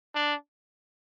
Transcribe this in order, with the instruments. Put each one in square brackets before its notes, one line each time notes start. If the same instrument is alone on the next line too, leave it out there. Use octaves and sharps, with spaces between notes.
[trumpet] D4